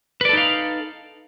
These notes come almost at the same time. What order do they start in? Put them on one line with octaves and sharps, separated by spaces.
B4 D5 A4 D#4 F5